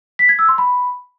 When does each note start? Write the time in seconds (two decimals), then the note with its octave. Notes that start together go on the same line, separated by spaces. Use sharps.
0.19 B6
0.29 G#6
0.39 E6
0.48 C6
0.58 B5